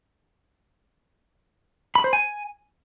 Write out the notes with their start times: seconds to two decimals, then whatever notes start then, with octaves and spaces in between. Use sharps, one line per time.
1.95 B5
2.04 C5
2.13 G#5